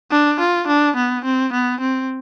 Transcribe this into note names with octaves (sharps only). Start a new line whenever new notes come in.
D4
F4
D4
B3
C4
B3
C4